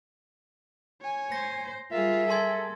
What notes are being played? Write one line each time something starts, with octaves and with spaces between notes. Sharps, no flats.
C#5 G#5
C5 A#6
G3 F4 G#4 A#4 E5
A4 A5 C6 G#6